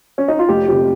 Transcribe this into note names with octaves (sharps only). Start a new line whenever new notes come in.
C#4
D#4
F4
F1 G4
F2 C3 G4